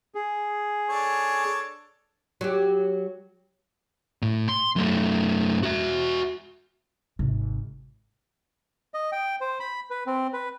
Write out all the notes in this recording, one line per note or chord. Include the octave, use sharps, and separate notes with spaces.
G#4
D4 A4 C#5
F#3 G4
A2
C6
F#2 A3
F#4 E5
G#1 C3
D#5
G5
C5
B5
B4
C4
B4